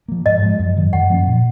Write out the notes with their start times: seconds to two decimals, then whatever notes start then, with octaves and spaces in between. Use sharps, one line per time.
0.08 F3 A#3
0.26 G#2 D#5
0.42 F3 G#3
0.59 F#2
0.76 D#3 F#3
0.93 F#2 F#5
1.10 F3 A#3 C#4
1.27 A#2